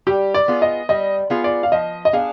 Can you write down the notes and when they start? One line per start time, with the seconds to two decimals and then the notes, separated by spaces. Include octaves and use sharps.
0.06 G3 G4
0.34 D5
0.48 B3 F4 G#4
0.62 D#5
0.89 G3 D#5
1.30 B3 F4 G#4
1.44 D5
1.63 F5
1.72 F3 D#5
2.05 D#5
2.13 B3 D4 G#4 F5